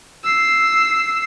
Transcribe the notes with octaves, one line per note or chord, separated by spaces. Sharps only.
E6 C7